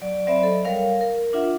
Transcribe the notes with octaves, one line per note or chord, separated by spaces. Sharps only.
F#3 D5
F#3 C4 C5 D5 E5 B5
A4 D#5
G3 A#4 C#5 F5
A#4
D4 F4 E5 F#5